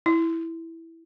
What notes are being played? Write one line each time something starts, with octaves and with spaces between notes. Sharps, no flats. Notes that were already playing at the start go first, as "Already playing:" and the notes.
E4